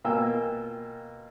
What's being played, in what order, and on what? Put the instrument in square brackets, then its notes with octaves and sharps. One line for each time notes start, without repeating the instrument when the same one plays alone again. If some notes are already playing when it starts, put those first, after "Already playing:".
[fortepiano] B2 A#3 F4 G5 G#5 E6